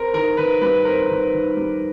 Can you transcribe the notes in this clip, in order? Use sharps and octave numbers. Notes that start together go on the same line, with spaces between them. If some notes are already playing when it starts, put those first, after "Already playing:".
Already playing: C4 A#4
D#3 A#4
D#3 B4
G3 B4
C4 A#4
D#3
D#3
G3